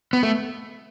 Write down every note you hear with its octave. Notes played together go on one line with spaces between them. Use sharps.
B3
A3